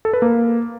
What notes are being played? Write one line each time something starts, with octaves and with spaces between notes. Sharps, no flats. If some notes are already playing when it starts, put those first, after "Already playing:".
A4
B4
A#3